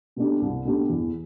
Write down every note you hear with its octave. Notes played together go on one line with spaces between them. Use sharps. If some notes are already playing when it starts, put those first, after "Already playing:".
B2 A3 D4 G4
C2
B2 A3 D4 G4
E2